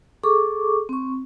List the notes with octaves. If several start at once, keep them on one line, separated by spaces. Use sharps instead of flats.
G#4 A4 C#6 D6
C4 C#6